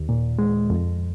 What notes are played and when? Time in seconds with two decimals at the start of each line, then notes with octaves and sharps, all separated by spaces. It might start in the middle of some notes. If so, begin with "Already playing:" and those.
Already playing: D#2
0.09 A#2
0.39 G#3
0.70 F2